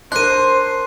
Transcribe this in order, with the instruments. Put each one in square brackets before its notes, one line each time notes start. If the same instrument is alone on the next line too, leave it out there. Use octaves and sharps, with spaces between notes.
[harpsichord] D4 A#4 [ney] C5 [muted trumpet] C6 [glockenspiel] F#6 D#7